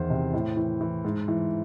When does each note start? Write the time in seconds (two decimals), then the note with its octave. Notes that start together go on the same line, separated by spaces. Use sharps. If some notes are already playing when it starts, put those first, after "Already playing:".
Already playing: E2 D#3 E3 C5
0.10 C3
0.33 A2
0.57 E3
0.81 E3
1.04 G#2
1.28 E3